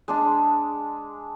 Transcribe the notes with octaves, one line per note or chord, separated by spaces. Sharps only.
G#3 D4 A5